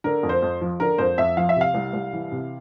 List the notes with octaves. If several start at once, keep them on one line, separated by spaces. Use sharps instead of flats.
D3 A#4
F2
C5
F2
F3
D3 A#4
F2 C5
F2 E5
F3 F5
E5
C3
F5
C2
C2
E3
C3